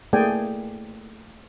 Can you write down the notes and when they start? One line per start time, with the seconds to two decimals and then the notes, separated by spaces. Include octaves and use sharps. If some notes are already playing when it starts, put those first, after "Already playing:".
0.13 A3 A#3 G#4 D5 G5 G#5